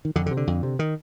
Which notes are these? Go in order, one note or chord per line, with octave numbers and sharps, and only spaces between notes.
D#3
F2 D3
D3
C3
D3
F2
C3
D#3